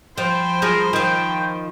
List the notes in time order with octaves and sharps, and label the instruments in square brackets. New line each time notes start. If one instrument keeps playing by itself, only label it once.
[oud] F3 [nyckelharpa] C5 B5 [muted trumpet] G5
[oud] F3 G#4 [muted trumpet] A#4
[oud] D#3 F3 [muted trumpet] G5